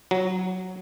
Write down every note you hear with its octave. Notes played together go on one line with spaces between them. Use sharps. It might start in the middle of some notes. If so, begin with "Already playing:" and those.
F#3